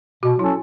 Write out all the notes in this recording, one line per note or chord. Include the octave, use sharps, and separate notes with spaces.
B2 F#4
F#3 C#4 E4 A4